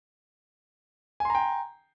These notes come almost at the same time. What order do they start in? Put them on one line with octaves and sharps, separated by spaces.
G#5 C6 A#5 G5